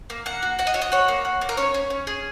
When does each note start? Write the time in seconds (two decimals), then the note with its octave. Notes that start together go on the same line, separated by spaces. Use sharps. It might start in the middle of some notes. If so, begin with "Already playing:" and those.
0.10 A#3
0.26 A#3 F#5
0.42 F#4
0.59 F#4 F#5
0.67 D#5
0.74 F#4 C#5
0.82 D#5
0.92 F#4 C#5
1.08 A#3
1.25 F#4
1.41 A#3
1.49 A#4
1.57 C#4 C#5
1.74 C#4
1.90 C#4
2.07 G#4